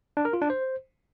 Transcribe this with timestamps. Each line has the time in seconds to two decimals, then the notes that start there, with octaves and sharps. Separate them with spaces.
0.17 D4
0.25 A#4
0.33 F4
0.42 D4
0.50 C5